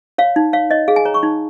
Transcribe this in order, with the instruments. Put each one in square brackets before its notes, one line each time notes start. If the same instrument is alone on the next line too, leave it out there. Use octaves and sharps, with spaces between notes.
[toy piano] C#5 F5
D#4
C#5 F5
C#5 D#5
G#4 F5
G#5
C#5 A#5
C#6
D#4